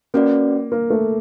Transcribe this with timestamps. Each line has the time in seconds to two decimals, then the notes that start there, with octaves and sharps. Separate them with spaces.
0.14 A#3 C#4 F#4 B4 D5
0.72 A#3
0.90 A3